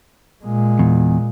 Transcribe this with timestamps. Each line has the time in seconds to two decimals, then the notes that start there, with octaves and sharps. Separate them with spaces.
0.44 A#2 G#3
0.79 E2